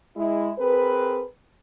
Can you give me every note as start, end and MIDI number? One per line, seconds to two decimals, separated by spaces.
0.17 0.51 56
0.17 0.51 64
0.59 1.22 60
0.59 1.22 68
0.59 1.22 70
0.59 1.22 71